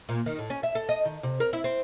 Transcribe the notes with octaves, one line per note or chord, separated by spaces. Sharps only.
A#2
D#3
A2
C#4
E5
A4
D#5
D#3
C3
A#4
E4
C4